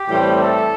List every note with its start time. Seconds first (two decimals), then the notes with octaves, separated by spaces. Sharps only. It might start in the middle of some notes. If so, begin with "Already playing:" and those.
Already playing: G4
0.10 A2 E3 G3 C4
0.41 A4